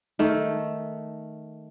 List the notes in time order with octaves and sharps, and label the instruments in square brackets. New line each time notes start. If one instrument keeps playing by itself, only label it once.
[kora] D#3 A3